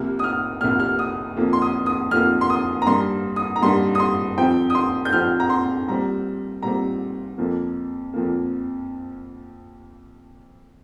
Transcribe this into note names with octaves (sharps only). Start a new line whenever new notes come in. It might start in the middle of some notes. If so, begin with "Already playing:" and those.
Already playing: C2 C3 F3 A#3 F6
D#6
F6
C2 C3 F3 A#3 F6
F6
D#6
F2 F3 A#3
C6
D#6
D#6
F2 F3 A#3 F6
C6
D#6
A#5
G2 G3 A#3 C6
D#6
A#5
G2 G3 A#3 C6
D#6
C6
F2 F3 C4 G5
D#6
C6
G6
F2 F3 C4 F6
A#5
C6
A#2 G3 C4 A#5
A#2 G3 C4 A#5
F2 F3 A#3
F2 F3 A#3